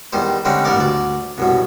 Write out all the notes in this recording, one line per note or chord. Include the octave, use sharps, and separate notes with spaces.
E2 D#3 G3 C5
D3 G3 G#3 C4 C#4 D#4
A1 G2 B3 A#4 D5 D6
D2 D5
C2 F#2 B2